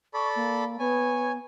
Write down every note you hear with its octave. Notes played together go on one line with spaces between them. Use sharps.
A4 D5 B5 C#6
A#3
B3 C#5 G#5